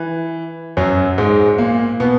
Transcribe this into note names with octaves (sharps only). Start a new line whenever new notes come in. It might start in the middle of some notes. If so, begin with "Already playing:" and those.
Already playing: E3
F#2 F#3
G#2 G#3
A#2 A#3
B2 B3